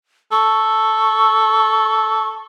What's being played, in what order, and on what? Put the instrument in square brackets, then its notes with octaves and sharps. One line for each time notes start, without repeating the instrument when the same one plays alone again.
[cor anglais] A4 [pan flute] C#6